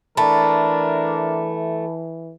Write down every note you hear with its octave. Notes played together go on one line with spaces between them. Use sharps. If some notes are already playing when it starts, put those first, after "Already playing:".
E3 A3 D4 A#4 D5 A5 B5